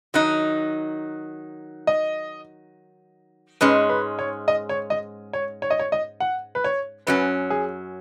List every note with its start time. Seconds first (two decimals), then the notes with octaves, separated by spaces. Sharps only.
0.14 D#3 F#3 D#4 F#6
1.87 D#5
3.61 G#2 G#3 C#4 B4
3.89 B4
4.19 C#5
4.48 D#5
4.69 C#5
4.90 D#5
5.33 C#5
5.62 C#5
5.70 D#5
5.79 C#5
5.92 D#5
6.20 F#5
6.55 B4
6.64 C#5
7.07 F#2 F#3 C#4 B4
7.50 G#4